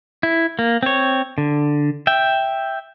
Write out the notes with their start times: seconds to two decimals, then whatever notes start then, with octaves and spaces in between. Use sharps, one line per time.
0.23 E4
0.59 A#3
0.83 C4 C#5
1.38 D3
2.07 E5 G5